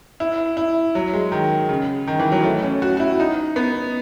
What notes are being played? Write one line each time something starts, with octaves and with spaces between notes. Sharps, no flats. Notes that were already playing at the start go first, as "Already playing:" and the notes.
E4
E4
F#3
G#3
D#3
C#3
D#3
E3
F#3
A3
C#4
F#4
F#4
E4
D#4
B3